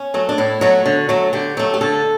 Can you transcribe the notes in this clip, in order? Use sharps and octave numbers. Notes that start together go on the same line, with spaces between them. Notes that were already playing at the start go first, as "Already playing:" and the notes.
Already playing: C#4
F#3 A3
D4
A2 E4
F#3 A3 F#4
D3
F#3 A3
D3 G4
F#3 A3
G4
D3 A4